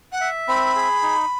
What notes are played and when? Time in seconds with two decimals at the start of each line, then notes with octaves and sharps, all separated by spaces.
0.12 F#5
0.21 E5
0.48 C4 B5
0.76 G#4
1.03 D#4